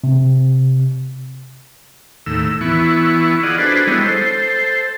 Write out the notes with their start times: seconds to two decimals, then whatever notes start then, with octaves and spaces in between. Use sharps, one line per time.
0.04 C3
2.26 D#2 A2 E6
2.61 E3 B3 E4 C#6
3.43 F4 G#4 D5 D#5 F#5
3.58 D4 F#4 G#4 A4 B4 C5
3.87 G3 G#3 B3 E4 C#5 D#5
4.03 A4 C5